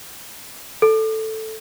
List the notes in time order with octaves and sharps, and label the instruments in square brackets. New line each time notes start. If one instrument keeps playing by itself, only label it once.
[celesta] A4